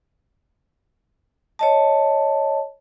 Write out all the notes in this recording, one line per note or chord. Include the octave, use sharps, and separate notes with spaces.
C#5 D#5 A5